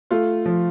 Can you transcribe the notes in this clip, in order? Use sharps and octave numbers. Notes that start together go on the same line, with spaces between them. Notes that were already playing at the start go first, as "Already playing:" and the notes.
A3 F4
F3